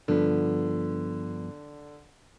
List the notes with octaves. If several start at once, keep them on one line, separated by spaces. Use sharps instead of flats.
G2 D3 F3 B3 F4 B4